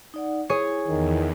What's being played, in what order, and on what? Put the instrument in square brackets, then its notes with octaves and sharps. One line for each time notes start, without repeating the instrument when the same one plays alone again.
[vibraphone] D#4 D5 F#5
[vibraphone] E4 [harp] G#4 C#5
[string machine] E2 [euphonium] D#3